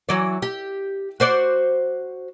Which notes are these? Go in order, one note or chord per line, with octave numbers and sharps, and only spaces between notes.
E3 F#3 D5
G4
F#4 C5 D5